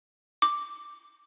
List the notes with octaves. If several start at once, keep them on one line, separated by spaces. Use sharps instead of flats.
D6